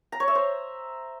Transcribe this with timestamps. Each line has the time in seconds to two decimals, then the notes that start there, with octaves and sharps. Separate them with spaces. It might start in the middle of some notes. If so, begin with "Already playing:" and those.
0.12 A#5
0.20 C#5
0.28 E5
0.35 C5